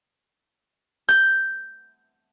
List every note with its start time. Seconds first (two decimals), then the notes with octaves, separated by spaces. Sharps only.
1.09 G6